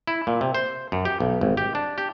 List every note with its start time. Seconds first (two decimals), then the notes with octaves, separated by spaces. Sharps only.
0.08 E4
0.27 A#2
0.41 C3
0.55 C5
0.92 F#2
1.05 G4
1.20 B1
1.41 G#1
1.57 G4
1.75 D4
1.98 G4